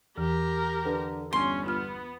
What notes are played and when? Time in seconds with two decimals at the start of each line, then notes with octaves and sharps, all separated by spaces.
0.17 E2 E3 G4 A#4
0.85 D3 A4 B4
1.33 G1 C#4 C6
1.66 B3 F4 F6